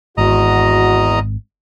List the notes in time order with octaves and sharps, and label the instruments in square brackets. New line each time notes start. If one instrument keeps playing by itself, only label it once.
[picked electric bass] G#1 [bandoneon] E2 D#5 A#5 [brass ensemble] F#4